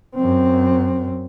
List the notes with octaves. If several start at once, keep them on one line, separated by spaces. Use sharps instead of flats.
F#2 C4